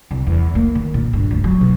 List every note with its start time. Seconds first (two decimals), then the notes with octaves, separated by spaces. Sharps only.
0.11 C2
0.27 E2
0.55 A#3
0.75 D#3
0.94 A#2
1.13 G2
1.31 D2
1.44 F#3
1.61 B2